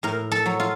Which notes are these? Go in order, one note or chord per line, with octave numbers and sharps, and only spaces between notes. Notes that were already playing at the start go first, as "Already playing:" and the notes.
A2 A#4
A4
F#3
F4